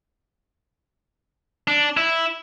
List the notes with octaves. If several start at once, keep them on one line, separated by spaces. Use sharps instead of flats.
D4
E4